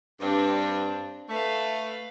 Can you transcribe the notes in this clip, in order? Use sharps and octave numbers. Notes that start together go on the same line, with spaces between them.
G2 C4 D4
A3 B4 F5